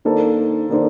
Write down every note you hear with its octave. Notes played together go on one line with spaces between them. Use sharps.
D#3 A#3 D4 A4 C5
D#3 A#3 D4 A4 C5